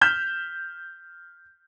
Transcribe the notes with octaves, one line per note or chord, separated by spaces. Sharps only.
F6 G6 B6 E7